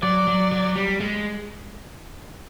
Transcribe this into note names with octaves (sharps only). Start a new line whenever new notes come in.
F#3 D5
F#3
F#3
G3
G#3